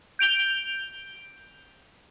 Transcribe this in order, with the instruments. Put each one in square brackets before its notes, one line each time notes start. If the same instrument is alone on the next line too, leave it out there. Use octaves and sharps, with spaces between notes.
[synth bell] G6 D7 F7 G7